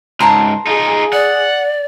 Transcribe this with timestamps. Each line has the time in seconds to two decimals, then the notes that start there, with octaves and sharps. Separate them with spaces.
0.20 C#2 G#2 A5 A#5 C6
0.67 D#4 F4 G#4
1.13 D5 F#5